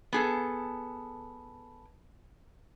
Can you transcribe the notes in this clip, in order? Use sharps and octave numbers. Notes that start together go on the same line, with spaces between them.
B3 G#4 A4